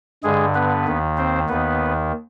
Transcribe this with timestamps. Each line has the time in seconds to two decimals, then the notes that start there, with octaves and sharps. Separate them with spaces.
0.23 G2 D3 G#3 G#4
0.54 B3 B4
0.87 D#2 D#3
1.17 C4 C5
1.48 D#2 D#3 B3 B4